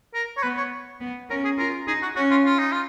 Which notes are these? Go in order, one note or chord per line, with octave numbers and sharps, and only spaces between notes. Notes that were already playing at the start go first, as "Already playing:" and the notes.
A#4
C#5
B3 B4
C#5
B3
C#4 A#4
G#4
F4 A#4
D#4 G#4
F#4
C#4 F#4
F4
F4
D#4
F4